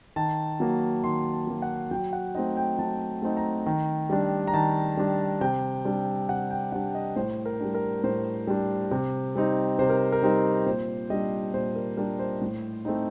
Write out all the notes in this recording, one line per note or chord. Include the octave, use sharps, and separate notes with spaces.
D#3 A5
F#3 A#3
D#3 C6
A5
F#3 A#3
F#5
F#3 G5
F#5
A3 C4 D#4 D#5
G5
F#3 A5
A3 C4 D#4
A#5
D#3
G3 D4
A#5
D#3 A5
G3 D4
C3 G5
G3 D4
C3 F#5
G5
G3 D4 F#5
D#5
A2 C5
A#4
G3 D4
A#4
A2 C5
G3 D4
C3
G3 C4 D#4
C3 C5
A#4
A#4
G3 C4 D#4
A#2 C5
G3 D4 D#5
A#2 C5
A#4
G3 D4 A#4
C5
A2
A3 C4 D#4